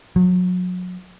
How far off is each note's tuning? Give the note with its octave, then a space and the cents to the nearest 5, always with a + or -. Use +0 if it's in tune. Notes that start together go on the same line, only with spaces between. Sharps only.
F#3 -30